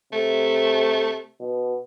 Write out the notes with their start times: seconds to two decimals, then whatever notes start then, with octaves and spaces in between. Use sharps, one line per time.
0.13 C3 A3
1.40 B2